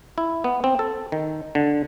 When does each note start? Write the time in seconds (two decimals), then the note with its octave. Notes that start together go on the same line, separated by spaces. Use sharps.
0.18 E4
0.44 B3
0.64 C4
0.79 A4
1.12 D#3
1.55 D3